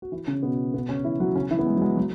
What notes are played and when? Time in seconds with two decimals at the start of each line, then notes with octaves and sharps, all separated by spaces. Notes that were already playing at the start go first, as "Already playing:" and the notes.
0.02 F#4
0.12 E3 E4
0.27 C#3 C#4
0.43 B2 B3
0.74 B2 B3
0.89 C#3 C#4
1.04 E3 E4
1.20 F#3 F#4
1.35 C#3 C#4
1.51 E3 E4
1.59 B3
1.67 G#3
1.77 F#3
1.82 G#3
1.97 F#3